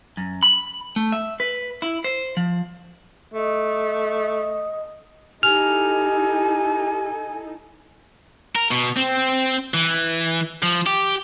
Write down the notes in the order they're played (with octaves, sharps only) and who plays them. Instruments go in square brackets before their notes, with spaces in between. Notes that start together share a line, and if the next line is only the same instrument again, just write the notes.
[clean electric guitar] F#2
B5
A3
E5
B4
E4
C5
F3
[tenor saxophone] A3 [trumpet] D#5
[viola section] D#4 E4 A4 [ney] G4 [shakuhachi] G#5 [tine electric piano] F6
[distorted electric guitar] A#4
B2
C4
E3
F3
G4